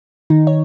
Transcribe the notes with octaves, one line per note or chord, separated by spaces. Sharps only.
D#3 D#4
C#5